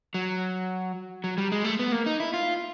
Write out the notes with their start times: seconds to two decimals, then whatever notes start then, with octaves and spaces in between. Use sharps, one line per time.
0.14 F#3
1.24 F#3
1.38 G3
1.52 G#3
1.64 A3
1.79 B3
1.92 A#3
2.06 D#4
2.20 E4
2.34 F4